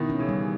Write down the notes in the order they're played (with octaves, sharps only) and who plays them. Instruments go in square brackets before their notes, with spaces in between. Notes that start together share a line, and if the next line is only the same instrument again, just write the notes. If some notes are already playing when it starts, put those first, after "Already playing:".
Already playing: [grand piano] B2 D#3 [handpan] E4
[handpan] C#4
[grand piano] C#3 E3
[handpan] G3